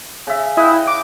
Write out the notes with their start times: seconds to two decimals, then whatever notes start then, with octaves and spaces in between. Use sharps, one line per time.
0.27 C#3 E5
0.57 E4 D#5 F#5 G5
0.87 D6